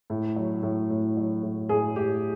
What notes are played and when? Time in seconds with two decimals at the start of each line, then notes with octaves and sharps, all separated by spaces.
0.10 A2
0.36 F#3
0.63 A2
0.90 A2
1.17 F#3
1.43 A2
1.69 A2 G#4
1.96 A2 G4